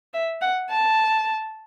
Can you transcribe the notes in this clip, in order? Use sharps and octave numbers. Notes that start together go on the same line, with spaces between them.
E5
F#5
A5